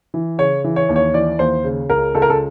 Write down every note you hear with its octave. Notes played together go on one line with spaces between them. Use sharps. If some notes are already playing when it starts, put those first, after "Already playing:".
E3
C#3 C#5
E3
C#5
D#2
C#5
E3 D5
D#2 C5
C#3
C#2 A#4
C#2 A4
A#4
A4